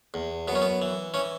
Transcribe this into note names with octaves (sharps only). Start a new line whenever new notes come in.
E2
F#2 B3
C#4
B3
E3
E3 C#4